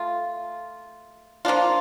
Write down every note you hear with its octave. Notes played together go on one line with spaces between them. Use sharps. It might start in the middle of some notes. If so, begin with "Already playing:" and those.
Already playing: A3 F4
F3 A#3 D4 F4